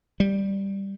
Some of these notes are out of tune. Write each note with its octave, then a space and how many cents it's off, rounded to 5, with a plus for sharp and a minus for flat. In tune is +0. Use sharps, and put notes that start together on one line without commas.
G3 +5